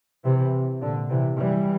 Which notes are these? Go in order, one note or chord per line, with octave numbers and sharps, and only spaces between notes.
C3 E3
A#2 D3
C3 E3
E3 G3